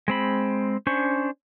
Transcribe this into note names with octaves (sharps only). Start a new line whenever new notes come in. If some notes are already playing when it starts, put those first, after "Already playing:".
G#3 C4 B5
C#4 D4 C5 C#6